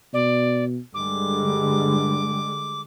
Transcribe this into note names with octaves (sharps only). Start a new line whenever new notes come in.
B2 D5
G2 D3 G3 G#3 D6